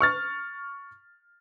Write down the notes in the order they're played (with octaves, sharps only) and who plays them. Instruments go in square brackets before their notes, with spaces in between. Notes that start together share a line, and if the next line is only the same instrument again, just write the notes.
[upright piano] C#6 F6 A6